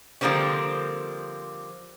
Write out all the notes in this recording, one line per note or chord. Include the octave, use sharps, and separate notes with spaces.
D3 F3 G3 A#3 C4 C#4